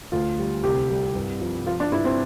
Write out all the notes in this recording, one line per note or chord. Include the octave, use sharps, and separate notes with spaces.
D2 F4
G3
C2 G4
G3
G2
F3
F3 F4
D4
G2 E4
C4